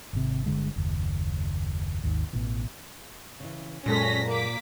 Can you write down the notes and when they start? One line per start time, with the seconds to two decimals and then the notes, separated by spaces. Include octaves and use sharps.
0.13 G#1 C3
0.46 G1 D2 D3 G#3
0.76 F#1 D#2
2.04 G#1 D#2
2.33 A1 B2 E3
3.40 C#3 E3
3.86 F#2 A#2 G#3 C#4 A4 A#6 B6
4.27 A#3 D6 B6